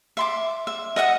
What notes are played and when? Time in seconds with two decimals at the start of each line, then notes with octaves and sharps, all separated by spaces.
0.17 E5 C6 D6
0.67 E5
0.96 D#5 E5 F#5 D#6